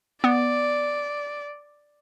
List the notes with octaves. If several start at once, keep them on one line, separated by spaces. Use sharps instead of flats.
B3 D5